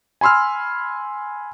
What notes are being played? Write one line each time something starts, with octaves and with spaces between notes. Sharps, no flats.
G#5 B5 C6 E6 F6